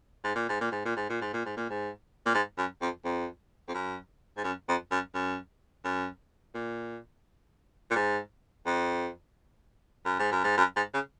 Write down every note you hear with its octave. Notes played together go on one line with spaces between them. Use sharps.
G#2
A#2
G#2
A#2
G#2
A#2
G#2
A#2
G#2
A#2
G#2
A#2
G#2
A#2
G#2
F#2
F2
F2
F2
F#2
G#2
F#2
F2
F#2
F#2
F#2
A#2
A#2
G#2
F2
F#2
G#2
F#2
G#2
F#2
G#2
C#3